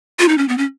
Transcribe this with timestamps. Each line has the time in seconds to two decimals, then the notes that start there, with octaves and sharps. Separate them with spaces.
0.19 F4
0.28 D#4
0.38 C#4
0.48 B3
0.58 C#4